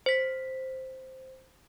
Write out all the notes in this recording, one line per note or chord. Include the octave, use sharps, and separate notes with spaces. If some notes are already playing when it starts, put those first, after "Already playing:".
C5 B6